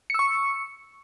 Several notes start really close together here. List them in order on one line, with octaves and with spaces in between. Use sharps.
C#7 E6 C#6